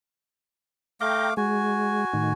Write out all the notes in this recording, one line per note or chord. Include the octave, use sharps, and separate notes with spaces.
A3 F5 G5 A#5 D6
G#3 F#4 G#5
A2 D#3